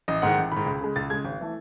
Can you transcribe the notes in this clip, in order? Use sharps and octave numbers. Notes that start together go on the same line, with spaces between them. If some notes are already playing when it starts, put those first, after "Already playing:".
A1 D#5
G#2 D#3 F#5
A1
G#2 D#3 B5
C#2
C#3 G#3
C#2 A6
C#3 G#3 G#6
G#1
E3 A3